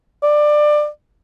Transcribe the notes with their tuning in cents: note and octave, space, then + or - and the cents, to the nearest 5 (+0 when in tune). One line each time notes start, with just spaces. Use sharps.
D5 +20